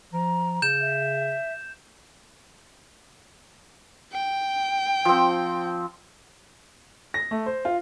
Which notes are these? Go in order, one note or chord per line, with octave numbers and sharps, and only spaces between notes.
F3 A#5
C#3 G6 E7
E5
G5
F3 C4
A#6
A3
C5
F4